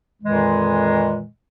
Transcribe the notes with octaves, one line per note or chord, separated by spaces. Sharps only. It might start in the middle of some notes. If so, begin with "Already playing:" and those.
F2 A#2 D#3 E3 G#3